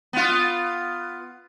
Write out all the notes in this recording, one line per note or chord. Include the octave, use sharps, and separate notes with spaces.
B3 F4